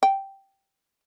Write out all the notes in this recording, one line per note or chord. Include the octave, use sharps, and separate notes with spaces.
G5